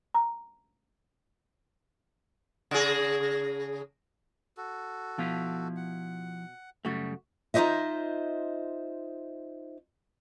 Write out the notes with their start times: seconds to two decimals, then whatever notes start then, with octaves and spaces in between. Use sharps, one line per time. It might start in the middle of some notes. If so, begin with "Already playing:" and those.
0.14 A#5
2.71 C#3 G#4
4.57 F#4 A4
5.19 B2 F3 E4 F5
5.76 F#5
6.85 F#2 C#3 G3 A3 F#4
7.54 D#4 F4 G4 C5 D#5 E5